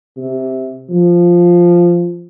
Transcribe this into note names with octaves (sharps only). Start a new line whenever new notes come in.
C3
F3